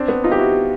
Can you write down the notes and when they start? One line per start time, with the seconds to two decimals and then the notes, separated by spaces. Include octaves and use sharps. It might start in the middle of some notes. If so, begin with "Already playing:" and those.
Already playing: C4 D4
0.08 B3
0.24 D#4 F4
0.32 G4
0.38 E4 F#4